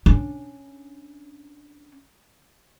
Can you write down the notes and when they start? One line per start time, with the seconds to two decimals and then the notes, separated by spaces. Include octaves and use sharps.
0.06 C#4 D4